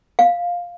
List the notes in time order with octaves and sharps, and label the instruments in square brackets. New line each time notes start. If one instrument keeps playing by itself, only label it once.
[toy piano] F5